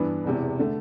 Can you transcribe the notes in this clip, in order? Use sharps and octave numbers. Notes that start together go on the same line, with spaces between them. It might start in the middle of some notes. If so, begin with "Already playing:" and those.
Already playing: G2 E3 B3 D4
E1 E2 C3
D3 A3